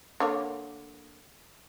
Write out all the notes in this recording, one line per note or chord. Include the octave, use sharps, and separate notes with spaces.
D3 A#3 C#5